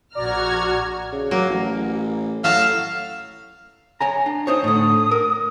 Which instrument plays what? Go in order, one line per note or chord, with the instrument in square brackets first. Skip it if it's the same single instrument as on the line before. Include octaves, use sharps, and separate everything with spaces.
[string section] A#1 A#5 F6 [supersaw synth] F#4 G#6 [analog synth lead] D5
[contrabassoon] C#3
[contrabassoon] F#3 [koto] A#3
[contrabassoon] A1
[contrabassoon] A2 [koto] F#3 E5 A5 [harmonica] F5
[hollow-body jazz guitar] C#5 G#5 A#5
D4
[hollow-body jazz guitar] D#4 C5 C#5 [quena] D#6
[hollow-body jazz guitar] A2 D3 [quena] D#6
[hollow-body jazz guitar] A#4